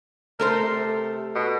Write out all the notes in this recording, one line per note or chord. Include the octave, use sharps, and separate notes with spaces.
A3 A4 A#4 C5
C3
B2